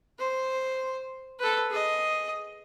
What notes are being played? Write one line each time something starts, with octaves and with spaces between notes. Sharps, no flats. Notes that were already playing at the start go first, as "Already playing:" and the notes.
C5
A4 B4
G#4 D#5